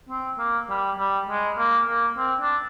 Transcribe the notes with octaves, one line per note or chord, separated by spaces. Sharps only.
C4
A#3
G3
G3
G#3
A#3
A#3
C4
D4